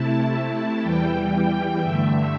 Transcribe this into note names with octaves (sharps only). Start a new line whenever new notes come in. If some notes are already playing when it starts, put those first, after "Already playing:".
Already playing: C3 A3 E4 A5
A5
E2 E3 G3 G5
G2 D3 A3 E5